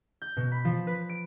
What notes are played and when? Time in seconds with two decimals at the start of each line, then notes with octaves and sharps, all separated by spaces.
0.22 G6
0.37 B2
0.52 B5
0.65 F3
0.87 B4
1.09 D7